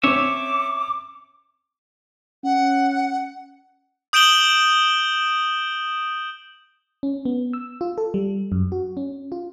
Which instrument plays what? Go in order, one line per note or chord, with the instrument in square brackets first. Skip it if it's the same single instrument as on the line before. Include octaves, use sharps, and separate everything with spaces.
[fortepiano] C4 C#4 [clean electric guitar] C#5 E5 [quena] D6
[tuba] C#4 [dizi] F#5
[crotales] D#6 G6 D7 E7 F#7 G7
[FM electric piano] C#4
B3
E6
F4
A4
G3
F#2
F#4
C#4
F4